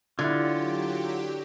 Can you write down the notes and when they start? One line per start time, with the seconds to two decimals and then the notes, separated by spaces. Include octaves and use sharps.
0.19 D3 F#3 E4 F4 G4 F#5 G#6